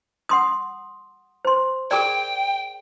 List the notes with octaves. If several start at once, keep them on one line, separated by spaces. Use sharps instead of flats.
F#5 C6 D#6
C5 C6
G#4 A#4 D5 G5